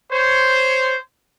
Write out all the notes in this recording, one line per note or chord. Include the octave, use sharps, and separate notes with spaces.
C5 C#5